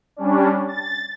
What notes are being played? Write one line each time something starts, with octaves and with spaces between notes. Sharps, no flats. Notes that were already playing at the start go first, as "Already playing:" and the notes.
G3 C#4 D4
A6